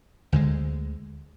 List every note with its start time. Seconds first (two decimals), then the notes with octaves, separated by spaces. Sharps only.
0.32 D2 D3 G#3